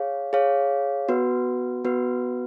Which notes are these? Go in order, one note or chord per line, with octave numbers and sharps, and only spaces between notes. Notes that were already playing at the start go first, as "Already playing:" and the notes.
Already playing: G#4 C#5 F5
G#4 C#5 F5
B3 F#4 B4
B3 F#4 B4